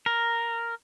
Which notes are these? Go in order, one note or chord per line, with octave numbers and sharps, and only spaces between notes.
A#4